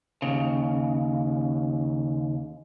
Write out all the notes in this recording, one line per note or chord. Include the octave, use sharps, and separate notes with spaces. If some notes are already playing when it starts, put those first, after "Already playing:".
D#2 C#3